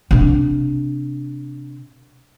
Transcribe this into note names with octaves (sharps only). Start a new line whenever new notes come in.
C3 D4